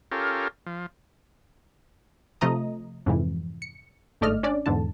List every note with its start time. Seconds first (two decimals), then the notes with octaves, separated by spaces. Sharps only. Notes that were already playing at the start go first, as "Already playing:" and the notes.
0.12 C#4 F4 G4 A4 A#4
0.66 F3
2.41 C3 F3 A3 D#5 A#5 D#6
3.06 F2 G#2 C3 E3
3.62 C#7
4.21 G1 G#2 A3 D5 D#5 F6
4.43 C#4 D4 D5
4.66 E2 G#2 D3 A5